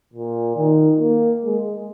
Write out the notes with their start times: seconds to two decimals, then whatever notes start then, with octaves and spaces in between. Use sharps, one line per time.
0.13 A#2
0.56 D#3
0.99 A#3
1.44 G#3